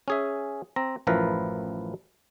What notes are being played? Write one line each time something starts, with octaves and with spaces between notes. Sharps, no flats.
C#4 G#4 E5
C4 A#5
A1 F#2 F3 E4 A#4 B4